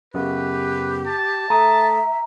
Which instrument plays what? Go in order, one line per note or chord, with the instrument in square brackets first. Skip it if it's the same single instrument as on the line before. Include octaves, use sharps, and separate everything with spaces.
[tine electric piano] F#2 C#3 B3 [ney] G4 [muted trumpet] B4
[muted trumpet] A5
[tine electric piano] A3 D#6 [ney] E5 [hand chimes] A#5